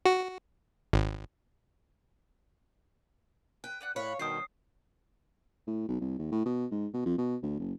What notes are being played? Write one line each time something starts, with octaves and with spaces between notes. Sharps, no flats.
F#4
G#1
B4 G5
B4 D5 F#5
A2 C#5 F5 B5 F#6
G2 B2 D#3 F4 C5 G5 D#6 C7
A2
B1
C2
D#2
A2
B2
G#2
B2
F2
B2
D2
F#1